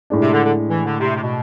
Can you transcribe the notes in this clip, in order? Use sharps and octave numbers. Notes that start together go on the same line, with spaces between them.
A2 G#3 D4
C3
D3
D3
E3
D3
C3
C3
B2